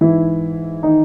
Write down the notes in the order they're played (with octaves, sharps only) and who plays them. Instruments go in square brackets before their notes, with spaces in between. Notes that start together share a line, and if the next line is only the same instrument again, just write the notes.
[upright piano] G#2 E3 E4
D#3 D#4